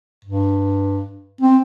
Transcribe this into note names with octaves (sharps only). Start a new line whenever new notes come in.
G2
C4